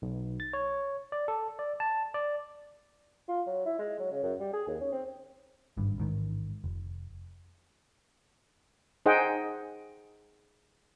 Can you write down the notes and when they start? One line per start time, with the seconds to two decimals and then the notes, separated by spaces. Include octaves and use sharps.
0.02 B1
0.40 A6
0.53 C#5
1.12 D5
1.28 A4
1.59 D5
1.80 A5
2.14 D5
3.28 F4
3.46 F#3
3.65 E4
3.79 G#3
3.99 F#3
4.11 C#3
4.23 F#2
4.40 G3
4.53 G#4
4.67 D#2
4.80 C#4
4.92 C4
5.77 G#1 G2
5.98 A1 G#2 D#3
6.64 F1
9.06 D#4 G#4 C5 D#5 F#5 G5